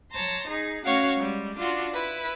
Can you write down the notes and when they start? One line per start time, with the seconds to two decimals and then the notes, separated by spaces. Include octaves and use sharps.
0.11 C#5 A5 A#5 C6
0.48 D#4 G#4
0.84 A3 C#4 F#4 C#5 F5 F#5
1.15 G3 G#3
1.57 D4 F4 F#4 C6
1.94 E4 B4